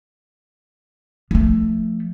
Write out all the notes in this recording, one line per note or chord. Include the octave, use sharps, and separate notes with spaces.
F3 A3